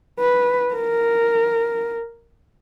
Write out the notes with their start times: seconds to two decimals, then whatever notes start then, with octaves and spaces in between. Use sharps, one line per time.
0.20 B4
0.74 A#4